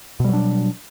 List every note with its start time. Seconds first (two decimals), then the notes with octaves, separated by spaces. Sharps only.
0.20 B2
0.24 G3
0.29 F#3
0.33 D4